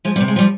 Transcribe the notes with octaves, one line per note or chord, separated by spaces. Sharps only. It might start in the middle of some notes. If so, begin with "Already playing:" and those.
F3 G#3
G3 B3
C3
G#3
F3 G3